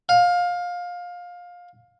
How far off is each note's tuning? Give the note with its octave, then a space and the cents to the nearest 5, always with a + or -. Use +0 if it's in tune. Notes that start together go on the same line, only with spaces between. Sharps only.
F5 +20